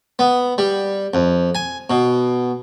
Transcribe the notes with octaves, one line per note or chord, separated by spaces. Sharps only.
B3
G3
F2
G#5
B2